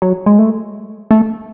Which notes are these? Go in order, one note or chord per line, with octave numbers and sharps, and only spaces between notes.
F#3
G#3
A3
A3